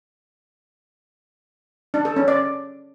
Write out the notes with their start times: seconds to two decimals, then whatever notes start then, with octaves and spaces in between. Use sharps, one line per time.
1.94 D4
2.05 A4
2.16 C#4
2.28 D5